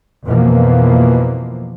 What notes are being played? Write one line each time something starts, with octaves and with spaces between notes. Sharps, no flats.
F2 B2 E3 F3 A#3